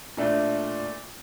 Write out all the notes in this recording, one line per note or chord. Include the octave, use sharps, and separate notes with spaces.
A#2 A3 D4